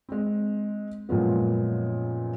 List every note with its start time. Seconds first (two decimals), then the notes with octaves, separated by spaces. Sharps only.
0.09 G#3 C4
1.09 F#2 A#2 F3 G#3 B3